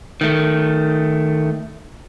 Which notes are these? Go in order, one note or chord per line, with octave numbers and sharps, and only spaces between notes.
D#3 A3